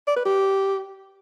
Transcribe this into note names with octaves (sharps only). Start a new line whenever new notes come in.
D5
B4
G4